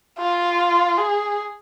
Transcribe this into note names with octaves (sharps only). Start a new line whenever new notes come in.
F4
G#4